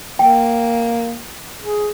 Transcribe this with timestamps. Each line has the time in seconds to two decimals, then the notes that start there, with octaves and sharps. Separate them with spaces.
0.19 A#3 G5
1.62 G#4